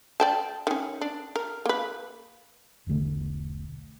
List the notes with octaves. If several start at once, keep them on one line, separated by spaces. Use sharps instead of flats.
D5 G5 A5
D#3 C#4
D4
A#4
A#3 B4
E1 B1 D3 A3